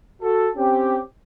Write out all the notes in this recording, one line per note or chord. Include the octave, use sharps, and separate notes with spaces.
F#4 A4
C4 C#4 G4